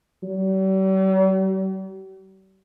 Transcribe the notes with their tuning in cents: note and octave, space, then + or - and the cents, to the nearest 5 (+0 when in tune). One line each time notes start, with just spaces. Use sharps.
G3 -45